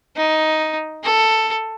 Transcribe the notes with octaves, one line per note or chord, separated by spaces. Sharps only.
D#4
A4